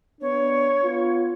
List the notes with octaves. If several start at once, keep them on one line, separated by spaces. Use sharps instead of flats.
B3 D4 C#5
B3 F4